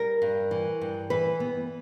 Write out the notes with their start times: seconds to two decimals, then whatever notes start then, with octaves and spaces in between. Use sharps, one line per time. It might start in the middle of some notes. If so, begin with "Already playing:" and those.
Already playing: G3 A#4
0.22 G2
0.51 E3
0.81 G2
1.10 E3 B4
1.40 B3